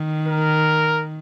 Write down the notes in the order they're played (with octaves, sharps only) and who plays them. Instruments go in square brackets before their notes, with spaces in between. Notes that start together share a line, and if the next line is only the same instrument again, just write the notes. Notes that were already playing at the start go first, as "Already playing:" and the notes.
Already playing: [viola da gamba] D#3
[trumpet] A#4